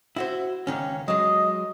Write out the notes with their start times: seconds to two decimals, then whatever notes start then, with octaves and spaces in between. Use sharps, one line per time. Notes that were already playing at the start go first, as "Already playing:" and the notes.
0.16 E4 F#4 C5
0.67 C#2 D#3 C#4
1.08 F#3 G#3 D#5